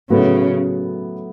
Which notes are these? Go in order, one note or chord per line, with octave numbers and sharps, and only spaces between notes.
A2 C#3 F#3 B3